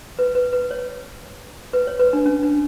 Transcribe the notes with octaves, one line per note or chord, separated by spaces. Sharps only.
B4
B4
B4
C#5
B4
C#5
B4
D4
C#4
D4